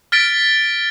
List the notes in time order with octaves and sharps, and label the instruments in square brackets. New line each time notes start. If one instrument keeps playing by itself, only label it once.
[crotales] F6 A6 B6 D7